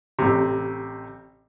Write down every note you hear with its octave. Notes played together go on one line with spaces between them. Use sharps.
A1 C3